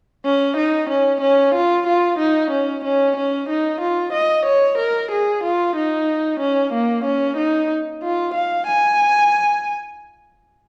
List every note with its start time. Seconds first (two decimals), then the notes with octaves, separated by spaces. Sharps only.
0.25 C#4
0.57 D#4
0.90 C#4
1.21 C#4
1.55 F4
1.87 F4
2.19 D#4
2.51 C#4
2.84 C#4
3.17 C#4
3.50 D#4
3.81 F4
4.13 D#5
4.46 C#5
4.78 A#4
5.12 G#4
5.44 F4
5.76 D#4
6.40 C#4
6.73 A#3
7.05 C#4
7.37 D#4
8.03 F4
8.35 F5
8.67 G#5